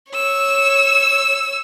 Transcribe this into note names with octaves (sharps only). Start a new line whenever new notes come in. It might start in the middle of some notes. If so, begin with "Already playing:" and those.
C#5 E6